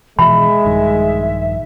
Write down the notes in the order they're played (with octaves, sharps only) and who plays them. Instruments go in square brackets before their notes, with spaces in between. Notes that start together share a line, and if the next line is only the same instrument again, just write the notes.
[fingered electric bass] B2 E3 F3 [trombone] G#3 [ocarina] E5 [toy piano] B5
[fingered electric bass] A#1 G2 D#3